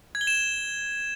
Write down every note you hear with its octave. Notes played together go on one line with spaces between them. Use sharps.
G#6
G7
E7